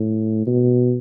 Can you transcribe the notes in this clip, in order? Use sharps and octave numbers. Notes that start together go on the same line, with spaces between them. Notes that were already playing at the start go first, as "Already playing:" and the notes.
Already playing: A2
B2